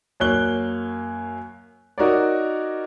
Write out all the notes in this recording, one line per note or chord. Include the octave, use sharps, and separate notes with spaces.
F#2 A#3 C#5 F#6 G7
D#4 F#4 A#4 C#5 D5